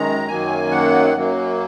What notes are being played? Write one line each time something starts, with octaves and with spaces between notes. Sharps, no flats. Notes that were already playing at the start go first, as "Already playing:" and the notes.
Already playing: F#2 D#3 G#3 A#5
F#2 D#3 F#3 A#3 G#5
F#5
F#2 F#3 A#3